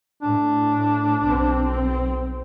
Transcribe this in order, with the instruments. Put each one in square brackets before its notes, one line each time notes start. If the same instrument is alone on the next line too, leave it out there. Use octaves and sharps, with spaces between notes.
[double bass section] A2 [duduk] D4
[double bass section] B1 C4